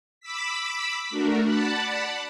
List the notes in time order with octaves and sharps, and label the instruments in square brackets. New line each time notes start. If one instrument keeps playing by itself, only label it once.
[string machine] B5 D6 E6 B6
A3 D4 F#4 A#4
D5 F#5 A5 B5